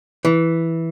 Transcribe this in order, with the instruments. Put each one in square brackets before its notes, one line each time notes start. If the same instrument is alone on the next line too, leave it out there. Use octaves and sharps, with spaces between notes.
[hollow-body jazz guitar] E3